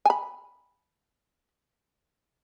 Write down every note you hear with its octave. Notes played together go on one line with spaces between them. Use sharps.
G#5 B5